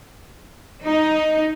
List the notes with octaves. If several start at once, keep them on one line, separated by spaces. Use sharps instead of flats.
D#4